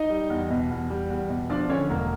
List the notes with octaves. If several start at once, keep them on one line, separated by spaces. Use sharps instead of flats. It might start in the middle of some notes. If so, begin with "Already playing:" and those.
Already playing: D#4 D#5
G3
E2
B2
E2
G3
E2
B2
F3 D4 D5
D3 C#4 C#5
E1 A#3 A#4